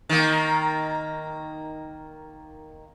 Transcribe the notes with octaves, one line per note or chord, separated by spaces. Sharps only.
D#3 A#3